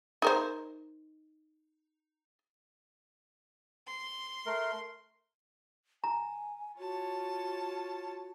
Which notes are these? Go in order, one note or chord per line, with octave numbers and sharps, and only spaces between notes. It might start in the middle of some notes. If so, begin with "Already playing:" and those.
D#4 A#4 C5
C6
A3 A#4
G#5 A#5
F4 F#4 C#5 A5